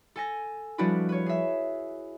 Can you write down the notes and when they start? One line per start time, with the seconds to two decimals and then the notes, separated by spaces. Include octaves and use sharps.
0.16 A4 G#5 A#6
0.78 F3 G3 D4 E4 F#4 B4
1.09 B4 C#5
1.26 G#4 E5